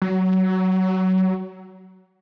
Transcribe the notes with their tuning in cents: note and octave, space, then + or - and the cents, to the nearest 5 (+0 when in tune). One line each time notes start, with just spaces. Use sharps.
F#3 +20